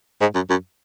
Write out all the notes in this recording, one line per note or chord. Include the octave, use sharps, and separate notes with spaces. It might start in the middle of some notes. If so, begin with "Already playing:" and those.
G#2
F#2
F#2